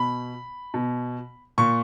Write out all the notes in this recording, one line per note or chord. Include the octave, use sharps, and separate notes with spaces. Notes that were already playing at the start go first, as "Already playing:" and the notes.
Already playing: B2 B5
B2
A#2 C#6